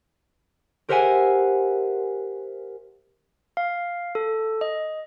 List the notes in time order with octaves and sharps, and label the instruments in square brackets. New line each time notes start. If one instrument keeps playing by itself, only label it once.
[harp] G4 A#4 C5 E5 F#5 G#5
[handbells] F5
A4
D#5